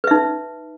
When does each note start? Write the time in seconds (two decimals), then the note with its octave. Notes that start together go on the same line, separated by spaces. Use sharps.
0.04 B4
0.07 E5
0.11 D#4